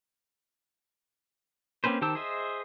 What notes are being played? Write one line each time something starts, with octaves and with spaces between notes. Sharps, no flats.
A#3 C4 C#4 B4 C5
D#3 G4 C5 A5 E6
G#4 C5 D#5 E5